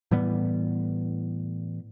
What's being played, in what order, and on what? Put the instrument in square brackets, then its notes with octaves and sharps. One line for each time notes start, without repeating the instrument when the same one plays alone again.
[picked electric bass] A2 E3 G3 B3